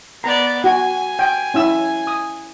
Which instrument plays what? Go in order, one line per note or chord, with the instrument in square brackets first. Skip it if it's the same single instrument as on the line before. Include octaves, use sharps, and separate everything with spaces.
[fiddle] B3 D5 [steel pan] A#5
[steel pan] F#4 [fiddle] G#5
[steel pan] G5
C#4 E4 E6
D#6